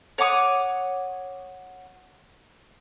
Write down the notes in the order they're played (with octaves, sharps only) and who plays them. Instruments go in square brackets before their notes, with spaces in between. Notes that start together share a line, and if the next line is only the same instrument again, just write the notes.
[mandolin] C#5 F#5 D6 D#6